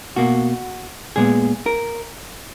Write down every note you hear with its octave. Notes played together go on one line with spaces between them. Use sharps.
B2 A#3 F#4
A#2 G#3 B3 G#4
A#4